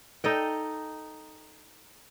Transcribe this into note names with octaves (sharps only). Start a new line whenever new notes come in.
D#4 A4 D#5 G5